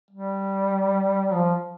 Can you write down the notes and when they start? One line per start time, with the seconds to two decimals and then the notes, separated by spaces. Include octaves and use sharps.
0.11 G3
1.33 F3